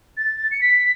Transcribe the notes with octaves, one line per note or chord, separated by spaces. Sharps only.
A6
C#7
B6